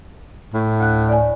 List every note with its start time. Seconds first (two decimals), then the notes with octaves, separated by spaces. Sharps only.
0.54 A2
0.80 D2 F#6
1.09 D5 G#5